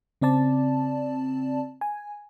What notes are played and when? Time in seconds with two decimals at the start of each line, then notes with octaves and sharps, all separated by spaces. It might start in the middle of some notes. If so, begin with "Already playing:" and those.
0.22 C#3 C4 D5 A5
1.81 G#5